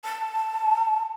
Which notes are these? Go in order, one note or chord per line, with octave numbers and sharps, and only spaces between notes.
A5